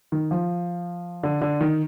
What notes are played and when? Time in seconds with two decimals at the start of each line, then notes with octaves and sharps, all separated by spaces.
0.12 D#3
0.31 F3
1.23 D3
1.42 D3
1.61 D#3